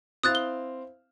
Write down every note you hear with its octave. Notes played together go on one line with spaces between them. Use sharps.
C4 E4 F5 D#6 F#6 A6
G7